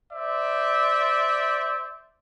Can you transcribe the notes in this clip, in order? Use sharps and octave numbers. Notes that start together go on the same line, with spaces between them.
C5 D5 E5